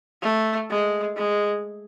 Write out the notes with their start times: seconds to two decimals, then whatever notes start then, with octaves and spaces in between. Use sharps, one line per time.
0.22 A3
0.69 G#3
1.15 G#3